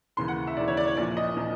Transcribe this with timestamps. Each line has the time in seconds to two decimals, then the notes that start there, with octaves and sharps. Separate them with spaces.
0.17 D#2 C#3 E3 C6
0.28 F#5
0.47 E5
0.57 D#2 C#3 E3 D5
0.68 C#5
0.77 D5
0.88 C#5
0.97 A#1 A#2 F3 D5
1.17 D#5
1.36 A#2 F3